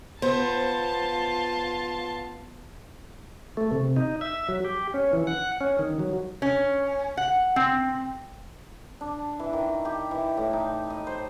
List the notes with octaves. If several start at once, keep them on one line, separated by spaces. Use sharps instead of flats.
B3 F4 C5 A5
A3
C3
D#4
E5
F#3
G4
C#4
E3
F#5
C#4
D#3
F#3
C#4
F#5
C4
D4
E3
D#3
G4
E3
A2
D#4
D#5
C5